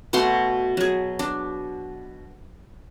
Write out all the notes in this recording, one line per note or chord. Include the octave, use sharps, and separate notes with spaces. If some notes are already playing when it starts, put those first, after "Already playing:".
B2 A3 F#5 C6
F#3 G#4
D4